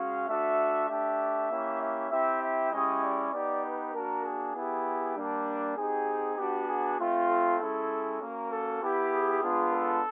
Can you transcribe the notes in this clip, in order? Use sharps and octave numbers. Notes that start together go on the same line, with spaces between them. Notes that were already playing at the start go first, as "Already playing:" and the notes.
Already playing: G#3 C#4 F#4 F5
A3 D4 F#4 E5
A3 D4 G4 E5
A#3 C#4 E4 G4
E5
C4 E4 G4 E5
E5
G#3 C#4 E4 G4 D#5
D5
B3 D#4 G4 D5
B4
A#3 D4 F#4 A#4
G#4
B3 E4 G4
G3 A#3 D4
C4 D#4 G4 G#4
B3 D4 F#4 G4
G#4
A3 C4 F4
A4
G#3 C#4 E4
A#3 C#4 F#4 A#4
A4
B3 E4 G4
G#4
G#3 B3 D4 F4
A4